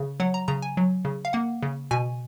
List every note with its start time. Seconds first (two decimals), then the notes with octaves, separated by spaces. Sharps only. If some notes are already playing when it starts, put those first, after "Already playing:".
Already playing: C#3
0.20 F#3 F#5
0.34 A#5
0.48 C#3 A#5
0.62 G#5
0.77 F#3
1.05 C#3
1.25 F5
1.33 A#3 F#5
1.63 C#3
1.91 B2 G#5